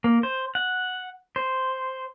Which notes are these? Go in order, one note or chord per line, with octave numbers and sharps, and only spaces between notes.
A#3
C5
F#5
C5